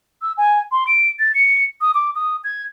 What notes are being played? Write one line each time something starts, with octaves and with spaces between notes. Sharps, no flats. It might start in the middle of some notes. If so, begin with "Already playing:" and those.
E6
G#5
C6
D7
A6
C#7
D#6
D6
D#6
G#6